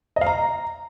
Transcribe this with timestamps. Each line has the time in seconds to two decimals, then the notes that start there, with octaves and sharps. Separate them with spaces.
0.16 D#5
0.21 F5
0.26 A#5